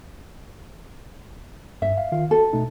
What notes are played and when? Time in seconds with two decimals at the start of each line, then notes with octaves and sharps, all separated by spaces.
1.82 G2 E5
1.98 F5
2.12 D#3 F4 F5
2.31 F#4 A4
2.53 B2 A3 D#4